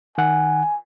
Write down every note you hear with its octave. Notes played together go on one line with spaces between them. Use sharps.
D#3 F#5 G#5